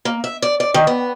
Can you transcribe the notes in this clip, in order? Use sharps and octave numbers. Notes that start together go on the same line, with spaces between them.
A#3
E5
D5
D5
D#3
B3